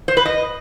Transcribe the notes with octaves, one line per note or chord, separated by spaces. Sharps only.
C5
B4
D#5